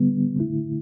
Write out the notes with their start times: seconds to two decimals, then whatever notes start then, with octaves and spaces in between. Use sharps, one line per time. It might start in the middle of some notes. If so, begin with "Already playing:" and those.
Already playing: D3 G3 B3
0.36 D3 A3 E4